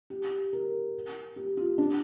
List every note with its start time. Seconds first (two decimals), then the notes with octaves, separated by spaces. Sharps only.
0.10 G4
0.53 A#4
1.36 G4
1.57 F4
1.78 D4